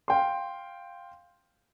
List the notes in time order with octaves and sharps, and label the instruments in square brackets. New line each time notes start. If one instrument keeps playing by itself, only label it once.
[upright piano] F5 G5 C6